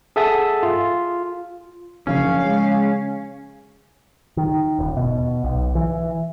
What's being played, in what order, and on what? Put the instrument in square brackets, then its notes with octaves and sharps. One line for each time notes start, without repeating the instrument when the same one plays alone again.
[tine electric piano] G#4 A4 E5 F#5 A5 D#6
F4
[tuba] F#1 [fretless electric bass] C#3 F3 D4 [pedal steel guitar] C#4 [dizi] F5
[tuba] G#3
[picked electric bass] D#3
D#1
B2
B1
E3